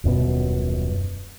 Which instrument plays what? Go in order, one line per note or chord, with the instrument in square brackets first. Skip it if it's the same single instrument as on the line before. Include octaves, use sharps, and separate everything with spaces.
[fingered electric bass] D#1 F#2 B2 B3